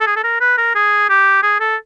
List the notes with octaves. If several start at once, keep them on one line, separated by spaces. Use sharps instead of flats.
A4
G#4
A4
A#4
B4
A#4
G#4
G4
G#4
A4